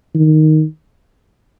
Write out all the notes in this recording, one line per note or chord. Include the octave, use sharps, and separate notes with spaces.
D#3